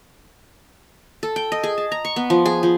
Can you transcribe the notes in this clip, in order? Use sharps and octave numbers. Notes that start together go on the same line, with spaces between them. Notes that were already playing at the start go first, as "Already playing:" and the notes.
A4
G5
D#5
G#4
A5
A#5
C#6
B3
F3
G#4
F3